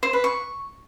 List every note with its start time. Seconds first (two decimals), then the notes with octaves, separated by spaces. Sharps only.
0.03 C5
0.13 B4
0.24 C#6